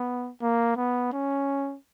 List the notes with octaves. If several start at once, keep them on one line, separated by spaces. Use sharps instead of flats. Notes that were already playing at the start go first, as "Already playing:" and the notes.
Already playing: B3
A#3
B3
C#4